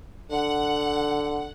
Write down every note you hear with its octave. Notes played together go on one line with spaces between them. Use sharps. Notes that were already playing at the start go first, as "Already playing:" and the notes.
D3 F#5